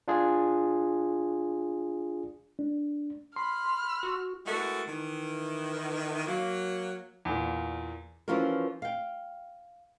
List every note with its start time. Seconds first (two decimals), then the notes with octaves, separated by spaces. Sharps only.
0.08 D4 F4 G#4
2.59 D4
3.36 B5 C6 F6
4.03 F#4
4.46 G#3 A3 B3 E4 F#4 A#4
4.87 D#3 E3
6.27 F#3 A#3
7.25 E2 A#2
8.28 E3 F3 C#4 F4 F#4 A#4
8.82 F5 G5